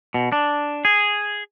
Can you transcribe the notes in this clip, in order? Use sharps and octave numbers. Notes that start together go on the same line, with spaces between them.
B2
D4
G#4